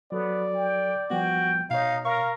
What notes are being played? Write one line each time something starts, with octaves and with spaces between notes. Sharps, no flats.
F#3 B3 F#4 A4 D5
G5
F3 G3 B3 F#4 G5
B2 D#4 C#5 F5
A#4 F5 C#6